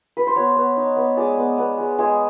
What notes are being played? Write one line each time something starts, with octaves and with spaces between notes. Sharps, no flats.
B4
C5
B3 C#5
B3
D#4
B3
G#3 D5
B3
B3
G#3
G#3 G#5